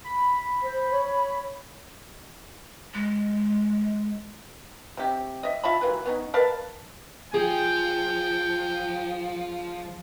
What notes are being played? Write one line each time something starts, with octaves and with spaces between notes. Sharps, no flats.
B5
C5
C#5
G#3
C3 G4
D#5 E5
F4 E5 A5 B5
E3 F#3 A#3 B4
B3 C#4 D#4
A#4 B4 F5 A5
F3 G#4 G5